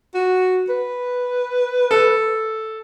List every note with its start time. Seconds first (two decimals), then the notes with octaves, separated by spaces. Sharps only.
0.14 F#4
0.69 B4
1.91 A4